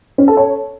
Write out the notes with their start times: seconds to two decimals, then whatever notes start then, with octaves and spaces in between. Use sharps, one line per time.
0.18 C#4
0.28 A4
0.37 C#5